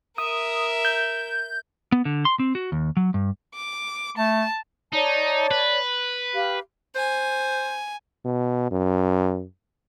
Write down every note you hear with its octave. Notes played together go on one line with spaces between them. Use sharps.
A#4 E5 D#6
G6
B3
D3
C6
C4
F#4
D#2
F#3
G2
D6
A3 A5
D#4 C#5 D5 A5
B4
G4 F5
C5 G#5
B2
F#2